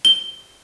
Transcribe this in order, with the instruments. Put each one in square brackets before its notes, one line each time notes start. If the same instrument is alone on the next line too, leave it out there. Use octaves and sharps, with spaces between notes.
[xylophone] G7